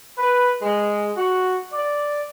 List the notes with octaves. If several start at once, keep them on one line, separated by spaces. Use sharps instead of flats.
B4
G#3
F#4
D5